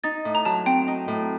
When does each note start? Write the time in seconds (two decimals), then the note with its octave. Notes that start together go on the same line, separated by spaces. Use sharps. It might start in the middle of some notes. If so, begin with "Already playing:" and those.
0.04 D#4 A6
0.25 A2
0.35 A#5
0.45 F#3 A5
0.66 C4 G5
0.88 D#4
1.08 A2